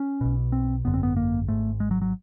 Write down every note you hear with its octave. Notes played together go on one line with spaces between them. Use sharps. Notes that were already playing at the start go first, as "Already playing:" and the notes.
Already playing: C#4
B1 B2
C4
G#1 F#2 D3 B3
C4
B3
A#3
G#1 G#2 A3
G#3
F#3
F#3